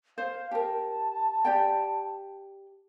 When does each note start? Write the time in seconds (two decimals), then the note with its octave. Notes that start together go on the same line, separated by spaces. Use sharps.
0.18 C5 F5
0.51 G4 A#4 A5
1.45 G4 D5 G5